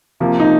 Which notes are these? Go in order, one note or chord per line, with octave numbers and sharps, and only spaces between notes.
C3 F3 A#3
D#4